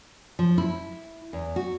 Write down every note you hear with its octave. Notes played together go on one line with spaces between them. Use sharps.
F3
E4
E2
F#4